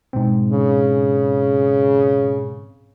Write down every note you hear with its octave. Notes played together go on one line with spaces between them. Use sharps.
G#2 B2 C4
C#3